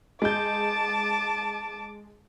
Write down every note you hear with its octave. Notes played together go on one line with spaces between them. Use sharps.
G#3 A5 D6 G6